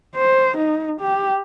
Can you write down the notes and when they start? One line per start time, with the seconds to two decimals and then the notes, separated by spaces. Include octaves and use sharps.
0.16 C5
0.57 D#4
1.01 G4